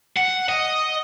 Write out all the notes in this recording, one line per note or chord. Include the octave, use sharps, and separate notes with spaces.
F#5
D#5